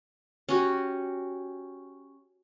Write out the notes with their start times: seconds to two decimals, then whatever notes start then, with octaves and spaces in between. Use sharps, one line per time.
0.49 C#4 F#4 G4